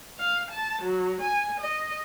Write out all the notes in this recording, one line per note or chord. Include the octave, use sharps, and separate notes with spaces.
F5
A5
F#3
G#5
D#5